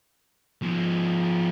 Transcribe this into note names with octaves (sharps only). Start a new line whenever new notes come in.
F3 B3